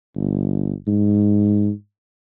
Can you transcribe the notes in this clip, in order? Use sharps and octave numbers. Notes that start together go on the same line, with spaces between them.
G1
G#2